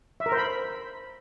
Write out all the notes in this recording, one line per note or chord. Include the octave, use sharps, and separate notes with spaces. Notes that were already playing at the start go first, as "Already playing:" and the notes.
E5
A#4
C5
B5